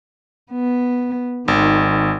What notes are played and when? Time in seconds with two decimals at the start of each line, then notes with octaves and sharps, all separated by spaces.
0.51 B3
1.48 G#1 D#3